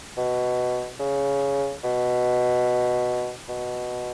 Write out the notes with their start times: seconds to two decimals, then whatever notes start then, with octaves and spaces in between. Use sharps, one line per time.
0.17 B2
0.99 C#3
1.83 B2
3.49 B2